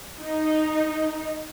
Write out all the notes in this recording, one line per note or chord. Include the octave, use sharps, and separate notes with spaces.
D#4